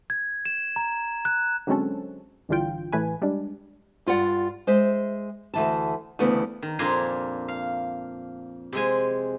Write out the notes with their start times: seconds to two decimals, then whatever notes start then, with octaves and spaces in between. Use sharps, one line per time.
0.10 G#6
0.45 E7
0.76 A#5
1.25 F#6
1.67 D3 F#3 G#3 C4 C#4 A4
2.49 A1 G2 D3 E3 F4 G5
2.92 A2 E3 A3 B4 G#5
3.22 G3 G#3 D4
4.06 G2 F4 D5 F#5
4.67 G#3 C5 E5
5.54 D2 E3 A5
6.19 D2 C#3 E3 A3 B3
6.62 D#3
6.79 F2 A#2 D4 G#5 A#5 C6
7.48 F5
8.73 C3 G#3 G#5